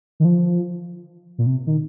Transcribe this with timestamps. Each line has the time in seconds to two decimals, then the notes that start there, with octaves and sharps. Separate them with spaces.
0.20 D#3
0.25 F3
1.38 A#2
1.46 C3
1.67 D#3